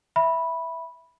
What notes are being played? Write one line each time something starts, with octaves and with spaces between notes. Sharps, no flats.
E5 B5